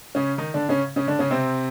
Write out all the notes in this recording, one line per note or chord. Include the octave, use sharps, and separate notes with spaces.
C#3 C#4
D#3 D#4
D3 D4
C#3 C#4
C#3 C#4
D3 D4
C#3 C#4
C3 C4